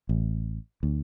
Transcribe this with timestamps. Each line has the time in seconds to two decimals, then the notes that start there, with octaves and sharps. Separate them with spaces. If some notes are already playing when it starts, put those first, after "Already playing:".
0.09 A1
0.83 D2